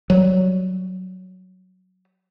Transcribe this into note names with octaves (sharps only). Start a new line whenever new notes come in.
F#3 G3